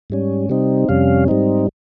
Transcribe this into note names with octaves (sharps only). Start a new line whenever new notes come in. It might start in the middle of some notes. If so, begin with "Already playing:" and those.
G#2 G3 C#4
C3 G3 C4 D#4
F2 C3 G3 C#4 F5
G#2 G3 C4 D#4